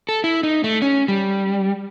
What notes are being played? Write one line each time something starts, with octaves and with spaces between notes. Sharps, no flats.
A4
E4
D#4
A3
C#4
G3